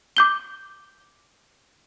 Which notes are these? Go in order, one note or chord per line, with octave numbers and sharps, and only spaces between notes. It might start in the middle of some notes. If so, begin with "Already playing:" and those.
D6 G6 G7